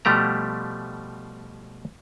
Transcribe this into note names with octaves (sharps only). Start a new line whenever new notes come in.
B2 F3 G3 A3 G4 A#5